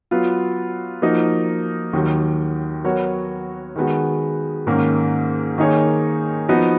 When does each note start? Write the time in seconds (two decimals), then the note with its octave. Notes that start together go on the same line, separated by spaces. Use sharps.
0.11 F#3 B3 F4
1.02 F3 A#3 D#4 F#4
1.93 D#2 D#3 F#3
2.84 F#3 B3 F#4 A#4 C#5
3.76 D#3 G#3 B3 F#4
4.67 G#2 D#3 A#3 C#4
5.58 D#3 A#3 D#4 G#4 C#5
6.49 F3 B3 D#4 F#4